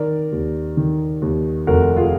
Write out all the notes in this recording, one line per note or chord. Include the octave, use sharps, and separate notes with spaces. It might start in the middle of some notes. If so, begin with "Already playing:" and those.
Already playing: D#3 A#4 D5
D#2
D#3
D#2
F1 F#4 A#4
F4 G#4